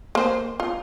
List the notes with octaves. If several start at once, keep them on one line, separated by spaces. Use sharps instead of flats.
A#3 C5
F4